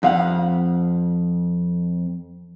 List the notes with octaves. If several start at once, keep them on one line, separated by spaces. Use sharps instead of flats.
F2 F5 F#5